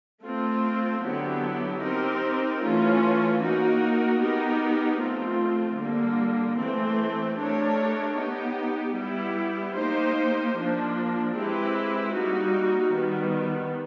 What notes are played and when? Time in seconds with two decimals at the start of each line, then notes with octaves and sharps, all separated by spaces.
0.23 A3 C4 F4
1.04 D3 F#3 B3 E4 G4
1.82 C4 D#4 G4 A#4
2.62 E3 A3 C#4 F4
3.41 A#3 D#4 F#4 A#4
4.20 B3 D#4 G4 A#4
5.00 F3 A3 C4 F4
5.79 D3 G3 A#3
6.59 E3 A3 C4
7.38 A3 D4 G4 A#4 C#5
8.18 B3 D#4 G4
8.97 G3 B3 E4 G4
9.76 A#3 D#4 G4 C5
10.56 F3 A#3 D4
11.35 G#3 C4 E4 G4 B4
12.14 G3 A#3 D#4 F#4
12.93 D#3 G3 B3